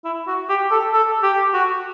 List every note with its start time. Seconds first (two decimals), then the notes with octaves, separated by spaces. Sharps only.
0.05 E4
0.27 F#4
0.49 G4
0.71 A4
0.93 A4
1.23 G4
1.53 F#4